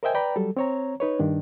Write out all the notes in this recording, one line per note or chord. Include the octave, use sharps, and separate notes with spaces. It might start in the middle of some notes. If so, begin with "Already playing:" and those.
A#4 C5 D#5 E5 G5 G#5
B4 D5 G5 A#5 B5
F#3 G3 A4
C4 C#5 A#5
D#4 B4 C#5
G2 D#3 D4